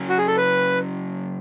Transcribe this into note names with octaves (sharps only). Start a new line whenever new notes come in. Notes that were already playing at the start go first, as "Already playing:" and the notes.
Already playing: C#3 F#3 C#4
F#4
G#4
A4
B4